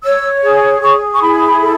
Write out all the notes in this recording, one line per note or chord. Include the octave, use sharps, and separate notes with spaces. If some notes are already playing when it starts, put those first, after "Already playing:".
C#5 E6
G#4
G#4 C#6
C#6
E4 B5
A4